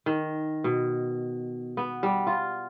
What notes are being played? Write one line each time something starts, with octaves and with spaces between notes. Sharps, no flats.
D#3
B2
B3
G3
F4